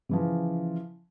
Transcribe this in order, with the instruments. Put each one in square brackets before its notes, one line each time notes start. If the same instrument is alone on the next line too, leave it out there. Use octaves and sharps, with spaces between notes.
[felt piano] C#3 E3 F3